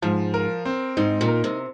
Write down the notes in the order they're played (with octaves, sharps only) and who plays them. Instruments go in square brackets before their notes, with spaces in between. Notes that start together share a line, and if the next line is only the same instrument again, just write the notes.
[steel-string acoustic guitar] G#2 [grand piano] F3
[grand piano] A#4
C4
[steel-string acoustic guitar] G#2 [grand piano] D#4
[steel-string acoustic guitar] A#2
[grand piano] A#4
[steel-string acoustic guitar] C3